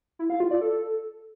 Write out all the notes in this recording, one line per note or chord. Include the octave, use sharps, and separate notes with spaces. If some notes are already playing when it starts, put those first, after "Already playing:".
E4
F5
F4
D5
A4